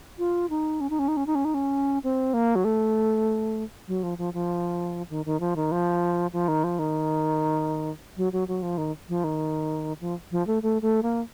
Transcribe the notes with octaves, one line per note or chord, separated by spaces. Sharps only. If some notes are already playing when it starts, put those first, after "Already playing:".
F4
D#4
C#4
D#4
C#4
D#4
C#4
D#4
C#4
D#4
C#4
C4
A#3
F#3
A3
F#3
F3
F3
F3
D#3
D#3
F3
D#3
F3
F3
D#3
F3
D#3
F#3
F#3
F#3
F3
D#3
F3
D#3
F3
F3
A3
A3
A3
A#3